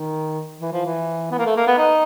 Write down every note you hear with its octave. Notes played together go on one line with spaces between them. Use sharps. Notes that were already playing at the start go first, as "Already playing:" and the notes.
Already playing: D#3
E3
F3
E3
B3
A#3
A3
A#3
B3
D#4